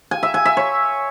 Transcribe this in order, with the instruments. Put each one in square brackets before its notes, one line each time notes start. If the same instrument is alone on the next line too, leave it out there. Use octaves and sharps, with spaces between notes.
[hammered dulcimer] G#5
E5
G#5
E5
C#5